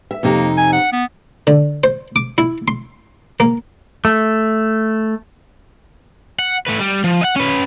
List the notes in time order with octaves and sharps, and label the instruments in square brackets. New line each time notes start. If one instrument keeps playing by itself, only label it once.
[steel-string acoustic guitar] E5
[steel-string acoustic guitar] F2 C3 D#4 [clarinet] A#3
[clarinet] G#5
F#5
B3
[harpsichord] D3
C5
D6
E4
C6
A#3
[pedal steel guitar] A3
[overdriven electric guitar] F#5
A3 B4
G3
F3
D#5 F#5
C#4 B4